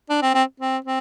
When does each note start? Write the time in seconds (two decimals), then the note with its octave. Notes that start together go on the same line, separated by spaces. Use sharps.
0.10 D4
0.22 C4
0.34 C4
0.60 C4
0.85 C4